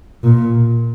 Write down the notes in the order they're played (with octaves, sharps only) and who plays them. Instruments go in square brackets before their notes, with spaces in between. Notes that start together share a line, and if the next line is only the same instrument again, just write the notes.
[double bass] A#2